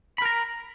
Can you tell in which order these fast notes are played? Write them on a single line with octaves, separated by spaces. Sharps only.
B5 A#4 A#5